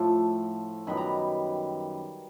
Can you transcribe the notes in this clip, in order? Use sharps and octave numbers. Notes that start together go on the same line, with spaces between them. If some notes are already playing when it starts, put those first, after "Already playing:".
Already playing: A2 F3 A3 A5
F#2 D#3 G3 B3 B5
A#5